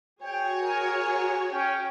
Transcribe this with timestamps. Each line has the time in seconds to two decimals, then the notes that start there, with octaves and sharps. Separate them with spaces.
0.21 F#4 G#4 C#5 G5
0.62 A#4 G#5
1.52 C#4 G5